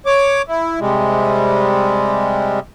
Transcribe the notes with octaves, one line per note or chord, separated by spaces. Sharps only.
C#5 D6
E4
C3 G3 G#3